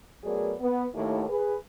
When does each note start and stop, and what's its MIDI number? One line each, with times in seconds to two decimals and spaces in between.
0.24 0.54 54
0.24 0.54 57
0.24 0.54 59
0.24 0.54 68
0.24 0.54 70
0.24 0.54 74
0.60 0.84 59
0.94 1.25 39
0.94 1.25 45
1.28 1.56 68
1.28 1.56 71